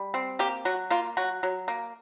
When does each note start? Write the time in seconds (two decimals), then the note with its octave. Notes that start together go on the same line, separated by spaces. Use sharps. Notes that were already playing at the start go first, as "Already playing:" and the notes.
Already playing: G3
0.14 C4
0.39 A#3 G4
0.65 F#3 F#4
0.90 A#3 F4
1.17 F#3 F#4
1.43 F#3
1.68 A#3